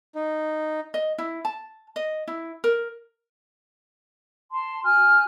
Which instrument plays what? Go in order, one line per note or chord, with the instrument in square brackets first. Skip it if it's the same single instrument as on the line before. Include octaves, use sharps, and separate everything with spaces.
[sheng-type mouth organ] D#4
[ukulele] D#5
E4
A5
D#5
E4
A#4
[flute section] A5 C6
F#4 G#5 F6 F#6